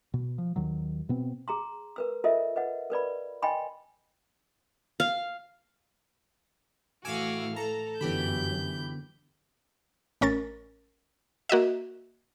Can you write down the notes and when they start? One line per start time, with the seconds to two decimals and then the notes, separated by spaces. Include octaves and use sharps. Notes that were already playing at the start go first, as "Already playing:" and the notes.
0.14 B2
0.38 F3
0.56 D#2 D#3 F#3
1.09 B2 B3 C4
1.48 G#4 A#5 C6
1.96 A#4 B4 E6
2.24 F4 A4 A#4 C5 D#5 E5
2.56 B4 D#5 F#5
2.90 A#4 B4 D5 B5
3.42 D#5 G5 G#5 B5 C6
5.00 F5
7.05 A2 E3 A3 F#4 F5 G#5 D6 E6
7.56 A4 A#5
8.01 G1 F#2 D3 E3 B3 G4 B5 G6
10.21 A1 C#4 A#4 A6
11.49 A#3 F#4 D#5 E5